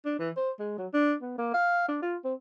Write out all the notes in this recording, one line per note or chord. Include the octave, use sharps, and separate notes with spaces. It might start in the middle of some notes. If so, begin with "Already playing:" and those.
D4
E3
C5
G#3
F#3
D4
B3
A#3
F5
D4
F4
C4